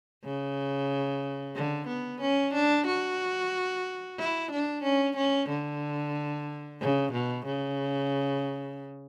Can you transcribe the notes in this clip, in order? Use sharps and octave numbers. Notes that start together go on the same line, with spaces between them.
C#3
D3
B3
C#4
D4
F#4
E4
D4
C#4
C#4
D3
C#3
B2
C#3